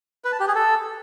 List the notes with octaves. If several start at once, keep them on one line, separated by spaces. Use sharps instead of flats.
B4
A5
G4
G#4
A4